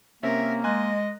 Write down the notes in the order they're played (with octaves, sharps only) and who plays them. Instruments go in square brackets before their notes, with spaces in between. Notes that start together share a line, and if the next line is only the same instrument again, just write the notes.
[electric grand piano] C3 C4 C#4 [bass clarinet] A#3 [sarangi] A#4 [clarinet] E5
[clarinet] G#3 [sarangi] D#5 [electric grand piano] G#5 C6 F#6